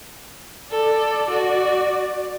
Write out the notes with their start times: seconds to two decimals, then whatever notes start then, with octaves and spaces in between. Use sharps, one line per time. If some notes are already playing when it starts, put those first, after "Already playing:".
0.72 A4 D5
1.30 F#4